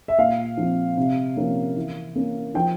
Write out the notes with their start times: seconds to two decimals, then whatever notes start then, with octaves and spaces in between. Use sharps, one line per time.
0.08 E5
0.19 A#2 F5
0.57 F3 C4
0.97 C3
1.37 F3 A#3 C#4
1.76 E3
2.15 A#3 C#4
2.54 F3 G5